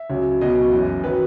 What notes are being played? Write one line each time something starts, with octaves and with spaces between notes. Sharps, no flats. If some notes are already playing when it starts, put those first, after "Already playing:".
Already playing: E5
C#2 C#3 F#3
C#2 B2 F#3 D#5
F#1 F#2 E3
D#3 F#3 B4